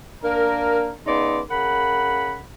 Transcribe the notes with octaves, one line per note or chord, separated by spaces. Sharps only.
A#3 D4 A#4
C#3 B3 D#4 D5 C6
C#3 A#4 F#5 B5